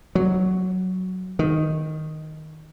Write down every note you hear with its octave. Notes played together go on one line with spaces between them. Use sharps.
F#3
D#3